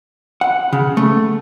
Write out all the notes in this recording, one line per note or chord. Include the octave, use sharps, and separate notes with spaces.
F#5
C#3
A3